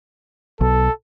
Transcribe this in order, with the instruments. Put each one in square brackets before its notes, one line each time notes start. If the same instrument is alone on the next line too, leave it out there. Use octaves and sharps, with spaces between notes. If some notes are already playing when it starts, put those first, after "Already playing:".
[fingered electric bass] B1 [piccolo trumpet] A4